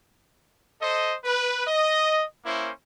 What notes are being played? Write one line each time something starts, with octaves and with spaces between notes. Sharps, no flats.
A4 C5 D#5
B4
D#5
A#3 C#4 E4 C5